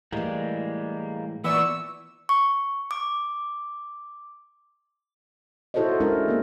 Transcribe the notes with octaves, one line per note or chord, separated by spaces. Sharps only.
A2 E3 G3 G#3 A#3
A#2 E3 B3 D5 C#6 E6
C#6
D6
E4 F#4 A4 C5 C#5 D#5
G#3 C#4 D4 E4 F#4 A#4
A#3 B3